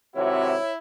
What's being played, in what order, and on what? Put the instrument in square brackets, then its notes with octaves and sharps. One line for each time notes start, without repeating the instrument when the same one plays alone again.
[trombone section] G#1 C3 F#4 [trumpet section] E4 E5 [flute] C#5